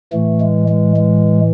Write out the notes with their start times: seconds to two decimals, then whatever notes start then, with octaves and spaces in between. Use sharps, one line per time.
0.13 A2 E3 A3
0.40 G#3
0.68 G#3
0.96 G#3